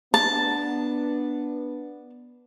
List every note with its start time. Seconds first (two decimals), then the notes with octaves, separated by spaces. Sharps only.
0.14 B3 D4 A5